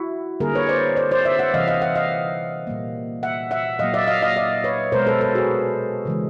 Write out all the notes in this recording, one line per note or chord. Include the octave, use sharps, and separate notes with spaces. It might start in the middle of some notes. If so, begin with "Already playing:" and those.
Already playing: E4 F#4
D3 G3 A#3 G#4 A#4
B4 C#5
C5 D5
C5 D5
C5 D5
D5 E5
E5 F#5
C3 E3 G3 D#5 F5
D#5 F5
E5 F#5
D#5 F5
A#2 G3 A#3
E5 F#5
E5 F#5
A#2 F#3 A#3 D#5 F5
D5 E5
D#5 F5
D#5 F5
D5 E5
B4 C#5
B2 G#3 A#4 C5
A4 B4
A4 B4
F#4 G#4
C#3 E3 G#3